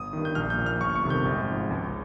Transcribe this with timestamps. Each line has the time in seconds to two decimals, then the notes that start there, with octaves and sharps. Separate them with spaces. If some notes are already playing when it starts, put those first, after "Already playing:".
Already playing: G1 D#6
0.13 G2 D#3
0.25 G6
0.35 A#1 F6
0.50 G6
0.58 A#2 F3
0.66 F6
0.81 G1 C#6
0.96 C#6
1.04 F2 C3 D#3
1.10 G6
1.25 G#1
1.49 G#2 F3
1.71 C#2